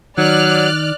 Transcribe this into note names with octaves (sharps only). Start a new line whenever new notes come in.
D#3 F#3 D5 F6 F#6